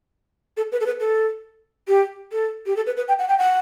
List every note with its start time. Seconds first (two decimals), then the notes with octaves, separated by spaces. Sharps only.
0.57 A4
0.72 B4
0.81 A4
0.86 B4
1.00 A4
1.88 G4
2.32 A4
2.66 G4
2.76 A4
2.87 B4
2.97 B4
3.08 G5
3.19 F#5
3.28 G5
3.38 F#5